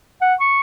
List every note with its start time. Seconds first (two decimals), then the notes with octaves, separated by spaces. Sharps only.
0.21 F#5
0.40 C#6